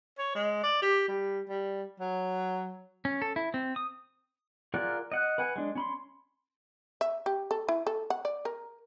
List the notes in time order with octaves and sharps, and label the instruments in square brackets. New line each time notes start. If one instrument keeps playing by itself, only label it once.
[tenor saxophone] C#5
G#3
D5
G4
G3
G3
F#3
[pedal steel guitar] C#4
A4
E4
C4
D#6
F4 G#4 A#4 D5 F#5
D#5 F#5 F#6
B4 F#5 G#5
G#3 D4
C#4 B5 C6
[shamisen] E5
G4
A4
E4
A4
F#5
D5
A#4